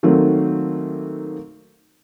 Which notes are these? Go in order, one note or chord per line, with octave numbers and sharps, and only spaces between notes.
D#3 F#3 A3 A#3 C4